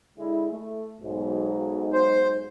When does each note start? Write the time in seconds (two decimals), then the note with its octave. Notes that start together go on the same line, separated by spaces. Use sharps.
0.17 D3 G#3 E4
0.51 A3
1.01 B1 G#2
1.93 C5